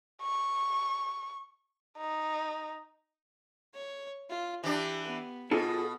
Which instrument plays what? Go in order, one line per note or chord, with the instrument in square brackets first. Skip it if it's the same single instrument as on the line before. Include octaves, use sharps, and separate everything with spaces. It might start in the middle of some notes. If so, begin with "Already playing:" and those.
[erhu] C#6
D#4
[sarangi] C#5
F4
[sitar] E3 D4 [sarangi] G4
[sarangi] B3
[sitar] B2 [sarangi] B3 [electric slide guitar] F4 G#4 A4